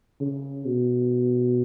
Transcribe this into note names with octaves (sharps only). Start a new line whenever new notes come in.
C#3
B2